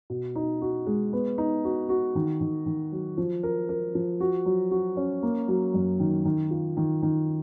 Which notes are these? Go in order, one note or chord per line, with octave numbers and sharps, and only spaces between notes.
B2
D#4
F#4
G#3
B3
D#4
F#4
F#4
D#3
D#3
D#3
F#3
F3
A#4
A#4
F3
F#4
F#3
F#4
C#4
A#3
F#3
F#2
D#3
D#3
F4
D#3
D#3